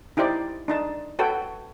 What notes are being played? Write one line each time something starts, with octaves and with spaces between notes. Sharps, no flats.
D#4 E4 G4 C5 D5
D4 D#4 A5
F#4 A4 B4 C#5 G5